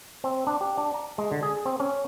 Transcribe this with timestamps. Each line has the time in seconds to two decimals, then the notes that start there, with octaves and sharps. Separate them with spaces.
0.24 C4
0.47 D4
0.61 G4
0.77 D4
0.94 A#5
1.18 G#3
1.32 D3
1.43 G#4
1.65 C4
1.80 C#4